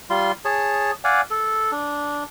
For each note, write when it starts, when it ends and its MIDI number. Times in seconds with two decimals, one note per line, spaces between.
0.10 0.32 55
0.10 0.32 65
0.10 0.32 84
0.45 0.91 68
0.45 0.91 73
0.45 0.91 81
1.04 1.21 74
1.04 1.21 77
1.04 1.21 78
1.04 1.21 80
1.30 1.71 69
1.72 2.24 62